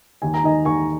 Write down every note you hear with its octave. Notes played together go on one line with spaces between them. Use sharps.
D#2 G#5
A#5
D#3 D#5 G#5
D#2 G#5 C#6